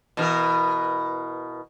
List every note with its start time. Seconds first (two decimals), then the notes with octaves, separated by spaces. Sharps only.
0.17 B2 E3 A#4